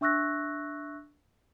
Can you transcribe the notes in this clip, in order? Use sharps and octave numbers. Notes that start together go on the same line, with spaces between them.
D4 E5 C#6 E6 F#6 A#6